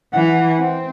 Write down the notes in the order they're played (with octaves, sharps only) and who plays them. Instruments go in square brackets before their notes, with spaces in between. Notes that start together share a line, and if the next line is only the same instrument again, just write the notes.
[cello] E3 [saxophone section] F#5
[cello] C4